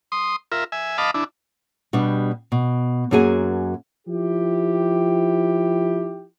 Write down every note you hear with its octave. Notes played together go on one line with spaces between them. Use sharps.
C6 D#6
F4 A#4 E5
E5 G#5
D#5 F5 A5 B5 D6
D4 E4
B2 G3 B3 D4 G4
B2
F#2 A#3 F#4 G#4 G#5
F3 E4 G4